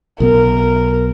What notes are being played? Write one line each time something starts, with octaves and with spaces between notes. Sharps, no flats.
B1 B2 B3 A#4